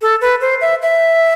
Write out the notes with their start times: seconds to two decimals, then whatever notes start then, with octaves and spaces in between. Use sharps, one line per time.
0.02 A4
0.21 B4
0.41 C5
0.61 E5
0.82 E5